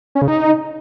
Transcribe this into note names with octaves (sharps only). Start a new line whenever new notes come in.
C#4
C#3
D#4